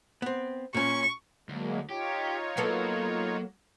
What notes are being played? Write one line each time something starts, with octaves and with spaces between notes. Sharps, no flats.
B3 C4
A#2 C#4 C#6
D2 F#3 G#3 A#3
D#4 F4 G4 C#5
F#3 A#3 B3 A4